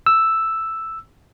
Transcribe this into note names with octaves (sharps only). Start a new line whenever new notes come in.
E6